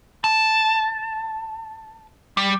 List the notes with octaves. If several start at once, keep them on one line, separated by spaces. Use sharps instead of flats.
A5
G3